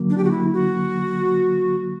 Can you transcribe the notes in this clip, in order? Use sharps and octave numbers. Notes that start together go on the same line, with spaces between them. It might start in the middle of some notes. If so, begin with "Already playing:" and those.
Already playing: D3 F#3 A#3
D4
G4
F#4
E4
F#4